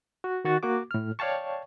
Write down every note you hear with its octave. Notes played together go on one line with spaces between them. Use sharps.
F#4
D#3 F#4 A6
A#3 F#4 D6
A2 F6
C#5 D5 F5 G5 A5 C#6